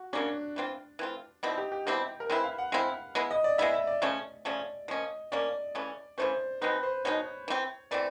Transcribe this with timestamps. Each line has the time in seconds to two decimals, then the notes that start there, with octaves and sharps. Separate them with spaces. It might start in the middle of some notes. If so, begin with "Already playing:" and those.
Already playing: F#4
0.13 C#3 F#3 A#3 C#4 D4
0.56 E3 A3 C4 F4
0.99 E3 A3 C4 F4
1.43 B2 G3 C4 D#4 E4
1.57 G4
1.72 G4
1.86 B2 G3 C4 E4 G4
2.20 A#4
2.29 G#3 C4 E4 B4
2.43 F5
2.58 F#5
2.72 G#3 C4 E4 F5
3.15 G#3 B3 E4
3.31 D#5
3.44 D5
3.58 G#3 B3 E4 E5
3.73 E5
3.87 D5
4.02 C#3 F3 A3 C#4
4.45 C#3 F3 A3 C#4 D5
4.88 F3 A#3 C#4 D#5
5.32 F3 A#3 C#4 D5
5.75 C#3 E3 A3 C#4
6.18 C#3 E3 A3 C#4 C5
6.61 B2 G#3 C4 D#4 B4
6.83 C5
7.05 B2 G#3 C4 D#4 C#5
7.48 E3 A3 C4
7.91 E3 A3 C4 D5